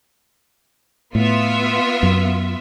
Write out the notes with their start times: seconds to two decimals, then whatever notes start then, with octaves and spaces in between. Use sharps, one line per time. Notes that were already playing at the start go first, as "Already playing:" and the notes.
1.15 A2 B3 F4 E5
2.03 F#2